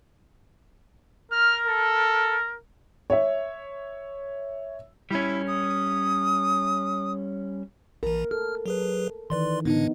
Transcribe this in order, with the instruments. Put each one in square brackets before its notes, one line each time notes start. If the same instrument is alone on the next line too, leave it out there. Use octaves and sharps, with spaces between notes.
[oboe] A#4 [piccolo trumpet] F6
[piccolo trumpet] A4
[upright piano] C#5 E5
[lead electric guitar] G3 C#4 [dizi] E4
[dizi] D#6
[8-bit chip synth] A#1 E3 [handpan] A#4
[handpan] A4 [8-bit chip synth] F6
[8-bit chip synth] F#3 G#4 B4
[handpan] D#3 E3 [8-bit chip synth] B4 D5 C6
[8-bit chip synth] A2 D3 D4 [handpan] B3 D#4